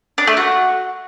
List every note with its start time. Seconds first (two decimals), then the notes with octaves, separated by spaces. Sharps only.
0.18 D4
0.27 A3
0.37 F#4